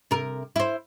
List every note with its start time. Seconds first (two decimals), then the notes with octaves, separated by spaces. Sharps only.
0.11 C3 A#4
0.56 E4 C5